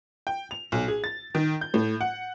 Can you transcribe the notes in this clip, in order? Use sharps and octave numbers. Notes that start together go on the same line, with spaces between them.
G5
F7
B1
G#4
A6
D#3
G6
A2
F#5